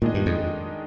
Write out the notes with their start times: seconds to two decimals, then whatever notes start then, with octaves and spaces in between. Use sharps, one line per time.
0.02 A#2 D#3 G#3 D4 G#4 D#5
0.14 G2
0.26 F2